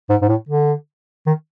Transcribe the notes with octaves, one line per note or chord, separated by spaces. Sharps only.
G#2
G#2
A2
D3
D#3